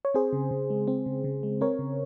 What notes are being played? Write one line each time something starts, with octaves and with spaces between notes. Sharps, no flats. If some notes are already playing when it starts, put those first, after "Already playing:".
C#5
C4 G#4 C5
C#3
C#3
G#3
C4
C#3
C#3
G#3
C4 A#4 C#5
C#3